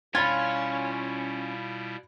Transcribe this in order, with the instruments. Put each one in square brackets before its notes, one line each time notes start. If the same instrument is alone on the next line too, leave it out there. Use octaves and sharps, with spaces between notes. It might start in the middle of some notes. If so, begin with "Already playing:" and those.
[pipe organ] B2 G3 E4 [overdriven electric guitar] C#4 [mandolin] F4 [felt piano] B5 G#6